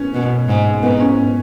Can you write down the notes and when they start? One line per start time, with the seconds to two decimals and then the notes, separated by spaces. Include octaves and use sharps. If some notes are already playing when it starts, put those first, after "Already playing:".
Already playing: B3 C#4
0.14 B2
0.49 G#2
0.83 G#2 B3
1.00 C#4